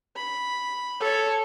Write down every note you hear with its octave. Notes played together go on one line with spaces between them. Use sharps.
B5
A4 C#5